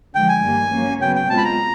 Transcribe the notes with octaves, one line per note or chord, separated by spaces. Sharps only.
D3 F3 G#3 G5
G#5
G2 D#3 G3 A#3
F#3 A#3 C#4
C#3 F#3 B3 G5
G5
B2 G#3 C4 F4 A5
B5
A#5